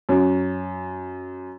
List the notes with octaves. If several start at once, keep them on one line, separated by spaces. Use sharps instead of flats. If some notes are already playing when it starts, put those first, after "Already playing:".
F#2